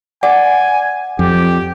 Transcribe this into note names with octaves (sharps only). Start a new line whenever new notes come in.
D5 F#5 G#5
F2 G4